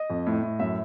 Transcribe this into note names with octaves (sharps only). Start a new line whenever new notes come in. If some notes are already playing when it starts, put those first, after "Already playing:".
Already playing: D#5
F2
A2
A2
F#2 E5